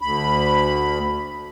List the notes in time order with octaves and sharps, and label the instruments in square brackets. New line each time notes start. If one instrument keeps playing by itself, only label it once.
[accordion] D2 B5